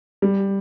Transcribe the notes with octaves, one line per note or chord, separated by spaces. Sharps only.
G3